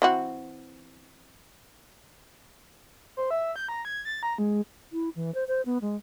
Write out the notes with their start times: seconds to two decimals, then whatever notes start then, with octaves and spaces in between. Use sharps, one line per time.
0.02 E3 C4 F#4
3.17 C5
3.31 E5
3.56 G6
3.69 A#5
3.85 G#6
4.05 A6
4.23 A#5
4.38 G#3
4.93 E4
5.16 E3
5.34 C5
5.48 C5
5.65 B3
5.81 G#3